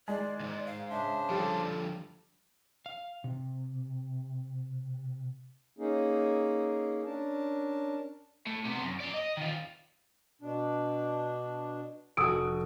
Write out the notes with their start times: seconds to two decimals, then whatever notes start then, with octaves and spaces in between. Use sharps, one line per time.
0.08 D#3 G#3 D5
0.40 D2 G#2
0.66 F5
0.90 C#3 D4 C5 E5
1.30 D3 F3 G3 A4
2.86 F5
3.24 C3
5.79 A#3 C#4 D#4 G#4
7.06 C#4 D4 A#4 A5
8.47 A2
8.65 C3 B3
8.82 F#2
9.00 D5 A#5
9.14 D#5
9.37 D#3 F4
10.42 B2 D4
12.17 F1 F#4 D#6 E6 D7